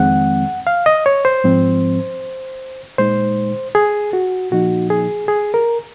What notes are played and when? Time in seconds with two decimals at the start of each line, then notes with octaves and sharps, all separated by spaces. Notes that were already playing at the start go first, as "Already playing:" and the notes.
Already playing: F2 D#3 G#3 C4 F#5
0.67 F5
0.86 D#5
1.06 C#5
1.25 C5
1.44 G#2 F3 C4
2.98 A#2 G#3 D#4 C5
3.75 G#4
4.13 F#4
4.52 A#2 F3 A#3 D#4 F#4
4.90 G#4
5.28 G#4
5.54 A#4